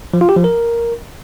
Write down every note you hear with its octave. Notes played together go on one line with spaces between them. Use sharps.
F3
F4
G4
F3
A#4